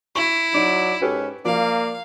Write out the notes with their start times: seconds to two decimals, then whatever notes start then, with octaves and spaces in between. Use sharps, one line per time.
0.16 E4 C#6
0.54 F#3 D#4 D5
1.02 G#2 C#4 G4 A4 B4
1.45 F3 A#3 D5 F5